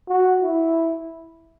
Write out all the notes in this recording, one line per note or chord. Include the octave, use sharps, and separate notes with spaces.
F#4
E4